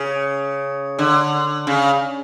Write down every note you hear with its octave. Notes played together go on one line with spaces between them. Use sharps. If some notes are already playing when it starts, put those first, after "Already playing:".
Already playing: C#3
D3
C#3